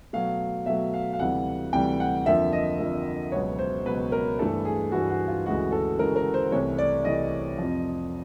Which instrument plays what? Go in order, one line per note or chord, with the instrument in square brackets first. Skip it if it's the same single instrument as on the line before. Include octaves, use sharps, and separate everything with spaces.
[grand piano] B2 F#3 A3 F5
B2 F#3 A3 E5
F5
F5
D2 C3 E3 G3 F#5
D2 C3 E3 G3 G5
F#5
F2 D3 F3 A#3 E5
D#5
F2 D3 F3 A#3
C#2 B2 F#3 B3 C#5
C5
C#2 B2 F#3 B3 B4
A#4
G2 E3 A3 A4
G#4
G2 E3 A3 F#4
F#4
F4
D2 C#3 E3 G#3 F#4
A4
D2 C#3 E3 G#3 A#4
A#4
C5
C2 C3 E3 A3 C#5
D5
C2 C3 E3 A3 D#5
F2 C3 F3